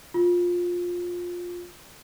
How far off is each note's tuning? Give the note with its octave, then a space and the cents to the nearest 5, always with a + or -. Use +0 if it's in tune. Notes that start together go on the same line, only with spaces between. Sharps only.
F4 +15